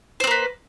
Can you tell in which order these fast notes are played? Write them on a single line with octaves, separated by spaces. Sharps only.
C5 C4 A#3 B4